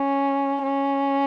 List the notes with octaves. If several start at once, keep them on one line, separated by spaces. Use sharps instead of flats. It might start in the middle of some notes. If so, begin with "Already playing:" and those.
Already playing: C#4
C#4